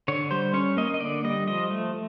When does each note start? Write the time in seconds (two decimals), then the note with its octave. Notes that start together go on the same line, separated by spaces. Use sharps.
0.08 D3 C#5
0.31 G3 C5
0.54 C#4 C#5
0.77 A#3 D#5
0.94 D#5
1.00 D3 D5
1.24 G3 D#5
1.47 F3 D#5
1.71 A3